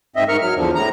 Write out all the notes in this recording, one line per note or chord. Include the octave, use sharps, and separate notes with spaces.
G#2 C4 D#5 E5
G#2 A#4 C#6 F6
F#3 F6
E2 D3 F3
A2 A#5